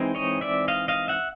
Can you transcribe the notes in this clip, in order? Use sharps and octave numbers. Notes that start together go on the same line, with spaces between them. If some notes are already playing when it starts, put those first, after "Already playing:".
Already playing: E3 G#3 C4 D#4
C#5 D#5
D5 E5
D#5 F5
D#5 F5
E5 F#5